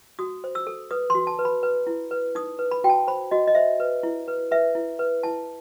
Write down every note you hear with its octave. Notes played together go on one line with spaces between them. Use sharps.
F#4 D#6
C5
E6
A4
B4 D#6
F#4 C6
A5
B4
B5
B4
E4
B4
D#4 D#6
B4
B5
F#4 G5
A5
C5 B5
F#4 D#5
D#5
C5 E5
B4
E4
B4
B4 E5
E4
B4
E4 A5